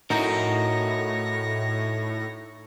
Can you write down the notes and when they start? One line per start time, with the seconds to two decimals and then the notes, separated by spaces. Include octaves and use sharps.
0.10 A2 D#4 F#4 A#4 C#5 A#6